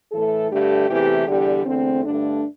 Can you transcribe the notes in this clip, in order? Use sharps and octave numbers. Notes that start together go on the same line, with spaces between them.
A2 E3 A3 A4
G2 D3 A3 G4
E2 C3 E3 A3 G4
E2 D3 G3 G4
E2 D3 A3 C4
G2 D3 A3 D4